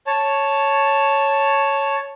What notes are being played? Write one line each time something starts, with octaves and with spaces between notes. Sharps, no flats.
C#5 A5